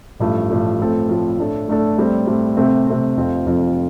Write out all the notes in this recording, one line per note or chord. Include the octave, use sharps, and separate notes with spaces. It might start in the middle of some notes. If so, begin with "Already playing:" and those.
A1 G2 F3 A3
A1 G2 F3 A3
A2 F3 A3 C4 A4
A2 F3 A3 C4 A4
A2 A3 D4 A4
A2 A3 D4 A4
A2 G3 C4 A4
A2 G3 C4 A4
C3 A3 C4
C3 A3 C4
F1 F2 F3 C4 F4
F1 F2 F3 C4 F4